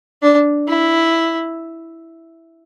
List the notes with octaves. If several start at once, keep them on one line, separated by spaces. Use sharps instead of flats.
D4
E4